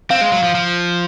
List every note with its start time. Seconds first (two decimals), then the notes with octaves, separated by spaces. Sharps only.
0.10 C4 F5
0.21 G#3
0.32 F#3
0.43 F3
0.55 F3